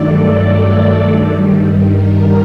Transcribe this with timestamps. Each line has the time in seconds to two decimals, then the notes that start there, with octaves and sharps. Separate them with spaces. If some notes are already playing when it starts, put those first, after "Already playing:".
Already playing: G2 D#3 F#3 A3 A4 D5
0.28 A4
1.10 G2 D#3 G3
1.91 A#4